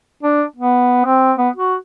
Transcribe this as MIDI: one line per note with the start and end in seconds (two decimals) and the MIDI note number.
0.23 0.44 62
0.56 1.06 59
1.06 1.33 60
1.38 1.49 59
1.56 1.76 66